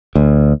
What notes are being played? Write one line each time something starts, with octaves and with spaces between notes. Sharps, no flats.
D2